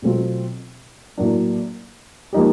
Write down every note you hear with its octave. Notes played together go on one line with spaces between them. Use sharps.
B2 F#3 A3 C4 F4
A2 F#3 A#3 D4
F3 A#3 D#4 G4